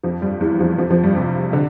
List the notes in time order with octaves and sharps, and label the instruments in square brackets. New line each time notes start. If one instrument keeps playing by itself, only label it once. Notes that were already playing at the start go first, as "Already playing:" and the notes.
[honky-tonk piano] F2 F3
G2 G3
E2 E3
F2 F3
F2 F3
F2 F3
G2 G3
C3
D3